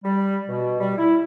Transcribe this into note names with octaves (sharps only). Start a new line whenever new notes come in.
G3
B2
G3
E4